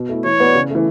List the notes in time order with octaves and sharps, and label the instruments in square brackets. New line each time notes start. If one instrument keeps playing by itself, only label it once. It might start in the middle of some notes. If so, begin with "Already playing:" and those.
Already playing: [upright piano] B2
A3 E4
[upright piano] E3 [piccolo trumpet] C#5
[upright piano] B3 F#4 B4 D5
C#3
E3 A3